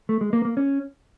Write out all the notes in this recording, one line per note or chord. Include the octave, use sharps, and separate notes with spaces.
A3
G#3
A#3
A#3
C#4